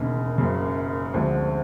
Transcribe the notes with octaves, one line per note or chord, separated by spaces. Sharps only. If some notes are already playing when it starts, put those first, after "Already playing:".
Already playing: E1 D#2 C#3
F#1 F#2 C#3
D2 D3 F3 G#3 C4